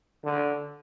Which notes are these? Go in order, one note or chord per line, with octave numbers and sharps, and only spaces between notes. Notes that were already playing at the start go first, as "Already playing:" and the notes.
D3